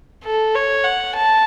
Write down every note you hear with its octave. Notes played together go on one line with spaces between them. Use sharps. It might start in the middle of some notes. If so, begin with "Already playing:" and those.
A4
C#5
F#5
A5